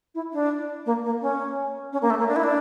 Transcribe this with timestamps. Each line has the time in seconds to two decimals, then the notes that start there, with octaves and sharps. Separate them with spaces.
0.14 E4
0.32 D4
0.85 A#3
1.04 A#3
1.21 C#4
1.92 C#4
2.01 A#3
2.10 A3
2.19 A#3
2.27 D4
2.35 E4
2.43 D4